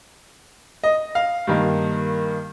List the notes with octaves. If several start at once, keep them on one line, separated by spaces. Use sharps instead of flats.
D#5
F5
G2 D#3 A#3